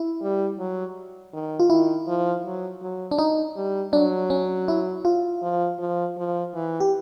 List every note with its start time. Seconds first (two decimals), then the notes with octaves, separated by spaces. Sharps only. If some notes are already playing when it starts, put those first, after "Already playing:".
Already playing: E4
0.22 G3
0.59 F#3
1.33 D#3
1.60 F4
1.70 D#3 E4
2.07 F3
2.45 F#3
2.82 F#3
3.11 D4
3.18 D#4
3.56 G3
3.93 F#3 D4
4.30 C#4
4.68 E4
5.05 F4
5.42 F3
5.79 F3
6.17 F3
6.54 E3
6.80 G4